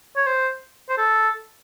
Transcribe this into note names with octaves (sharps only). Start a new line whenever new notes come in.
C#5
C5
C5
A4